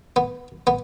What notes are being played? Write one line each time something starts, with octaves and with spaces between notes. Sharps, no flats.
B3
B3